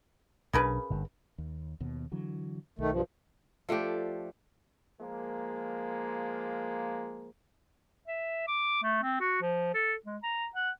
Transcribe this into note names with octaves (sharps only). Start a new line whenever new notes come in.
B1 C#3 D4 A#4 B4
G1 G2
D#2
D#2 B2
D3 E3 F#3
B1 D#3 A3
G2 F3
F3 A3 D4 G4
F3 G#3 A#3
E5
D6
A3
C4
F#4
F3
A4
G#3
A#5
F#5